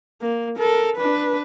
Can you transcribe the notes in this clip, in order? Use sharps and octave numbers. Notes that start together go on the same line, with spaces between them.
A#3
A4 A#4
D4 B4